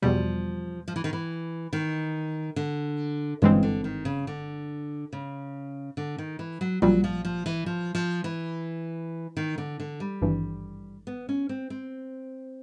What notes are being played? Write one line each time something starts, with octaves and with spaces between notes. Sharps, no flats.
E2 B2 F3 G3
F3
E3
D#3
E3
D#3
D3
G1 G2 C#3 E3 G#3 C4
D3
D#3
C#3
D3
C#3
D3
D#3
E3
F#3
A#1 A#2 F#3 G3
F3
F3
E3
F3
F3
E3
D#3
D3
D3
G3
G#1 G2 E3
B3
C#4
C4
C4